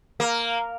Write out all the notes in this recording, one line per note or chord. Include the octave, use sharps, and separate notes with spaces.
A#3